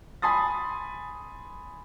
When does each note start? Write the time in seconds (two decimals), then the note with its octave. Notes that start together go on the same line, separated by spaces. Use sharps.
0.22 G#5 B5 C6 D#6 A6